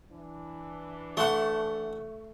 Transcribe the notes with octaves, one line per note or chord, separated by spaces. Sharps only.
E3 D4
A3 E5 F#5 A5 C6 C#6